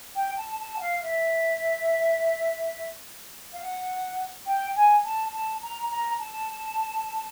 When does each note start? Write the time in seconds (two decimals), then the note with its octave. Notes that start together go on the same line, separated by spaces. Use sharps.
0.16 G5
0.37 A5
0.59 A5
0.77 F#5
0.81 F5
1.02 E5
3.53 F5
3.61 F#5
4.47 G5
4.76 G#5
5.04 A5
5.33 A5
5.62 A#5
5.91 A#5
6.19 A5